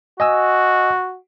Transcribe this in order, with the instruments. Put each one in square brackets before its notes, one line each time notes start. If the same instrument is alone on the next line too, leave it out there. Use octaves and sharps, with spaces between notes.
[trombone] F#4 [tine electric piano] D#5 G#5 E6